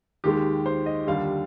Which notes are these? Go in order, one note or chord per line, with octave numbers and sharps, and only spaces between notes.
D#2 D#3 G#3 G4
C5
D#5
D#2 D3 G3 F5